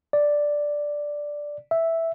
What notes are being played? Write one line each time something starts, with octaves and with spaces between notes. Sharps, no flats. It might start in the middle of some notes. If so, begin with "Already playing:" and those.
D5
E5